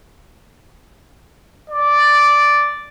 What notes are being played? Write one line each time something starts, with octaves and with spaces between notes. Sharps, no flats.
D5